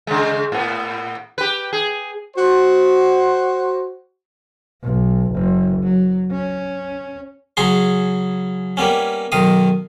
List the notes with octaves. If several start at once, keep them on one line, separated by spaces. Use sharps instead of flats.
C#3 G#3
A2 B3
G4 B4
G#4
F#4 C5
B1
F#1
F#3
C#4
C#3 F#3 G#4 C6
G3 A#3 B3 C#4
B1 D#3 F5 D#6